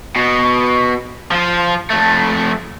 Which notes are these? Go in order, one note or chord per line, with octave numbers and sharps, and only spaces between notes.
B2
F3 F4
F2 A3